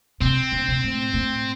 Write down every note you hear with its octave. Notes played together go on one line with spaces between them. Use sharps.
C3 C4
C#3
C3
A2
A2